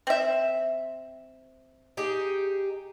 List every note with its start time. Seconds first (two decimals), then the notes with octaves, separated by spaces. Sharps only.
0.07 C4 E5
1.97 D#4 G4 G#4